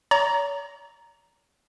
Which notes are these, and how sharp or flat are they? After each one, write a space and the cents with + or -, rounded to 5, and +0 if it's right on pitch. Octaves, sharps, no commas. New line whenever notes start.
C#5 +45 A#5 +0